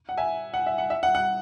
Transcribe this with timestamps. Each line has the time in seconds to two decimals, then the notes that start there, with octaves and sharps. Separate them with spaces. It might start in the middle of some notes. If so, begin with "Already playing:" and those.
0.09 F#5
0.17 E5 G#5
0.54 F#5
0.66 E5
0.78 F#5
0.90 E5
1.03 F#5
1.15 F#5